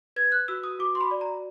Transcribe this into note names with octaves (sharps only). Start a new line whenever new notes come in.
B4 G#6
F#6
F#4 E6
D#6
F#4 D6
C6
B5
D5
A#5